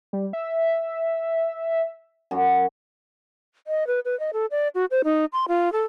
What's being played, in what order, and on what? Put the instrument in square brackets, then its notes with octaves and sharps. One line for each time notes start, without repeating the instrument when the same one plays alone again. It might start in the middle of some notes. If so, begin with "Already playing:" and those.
[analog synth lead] G3
E5
[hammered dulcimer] F#2 F#4
[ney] D#5
B4
B4
D#5
A4
D5
F#4
C5
D#4
C6
F4
A4